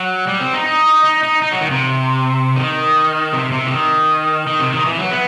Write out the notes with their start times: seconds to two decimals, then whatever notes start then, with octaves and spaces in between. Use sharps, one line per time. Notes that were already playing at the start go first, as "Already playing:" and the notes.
Already playing: F#3
0.27 G3
0.40 C4
0.53 D#4
0.66 D#4
1.04 D#4
1.23 D#4
1.42 D#4
1.52 F#3
1.61 D#3
1.71 C3
2.56 D#3
3.33 C3
3.52 C3
3.67 E3
3.71 D#3
4.47 D#3
4.60 C3
4.73 D#3
4.86 E3
4.98 F#3
5.11 B3